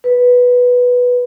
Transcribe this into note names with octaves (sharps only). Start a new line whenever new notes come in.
B4